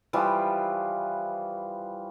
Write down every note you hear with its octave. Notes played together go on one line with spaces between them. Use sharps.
E3 F3 G3 F4